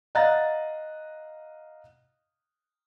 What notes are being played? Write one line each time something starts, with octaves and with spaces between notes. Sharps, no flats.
D#5 F5 F#5 A#5 F#6 A6